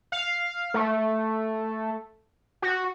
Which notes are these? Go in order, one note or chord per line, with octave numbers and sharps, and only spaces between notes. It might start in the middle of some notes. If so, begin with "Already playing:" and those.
F5
A3
F#4